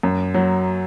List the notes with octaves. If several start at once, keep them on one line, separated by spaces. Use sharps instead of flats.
F#2
F#3